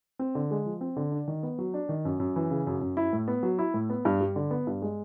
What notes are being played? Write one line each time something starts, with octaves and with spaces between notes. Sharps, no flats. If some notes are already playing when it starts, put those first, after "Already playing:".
C4
D3
G#3
F3
C4
D3
D4
D#3
B3
F#3
D4
D#3
F#2
F#2
E3
C#3
F#2
F#2
E4
A2
B3
F#3
E4
A2
B3
G2
G3
D3
B3
G2
G#3